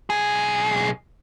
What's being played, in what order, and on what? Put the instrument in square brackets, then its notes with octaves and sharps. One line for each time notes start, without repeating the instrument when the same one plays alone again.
[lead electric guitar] B1 G#4